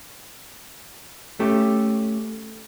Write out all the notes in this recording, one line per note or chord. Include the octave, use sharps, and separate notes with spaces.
A3 C#4 G4